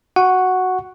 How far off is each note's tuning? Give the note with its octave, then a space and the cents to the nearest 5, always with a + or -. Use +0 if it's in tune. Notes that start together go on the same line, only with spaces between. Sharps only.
F#4 +0 F#5 +0 C#6 +0